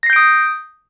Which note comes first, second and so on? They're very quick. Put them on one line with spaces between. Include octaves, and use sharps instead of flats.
A#6 C7 G6 D7 D#6